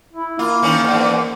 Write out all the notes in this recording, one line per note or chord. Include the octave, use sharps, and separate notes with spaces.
E4
A#3 F4
D#3 E3 C#4
E2 G#2